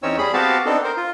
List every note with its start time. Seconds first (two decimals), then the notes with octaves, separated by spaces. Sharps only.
0.03 E2 C4 C#4 D#4 C#5 E6
0.18 G3 G#4 B5
0.34 B3 C4 F#4 G4 F5 A5
0.66 B3 C4 D4 D#4 A4
0.84 A#4 C5
0.97 F4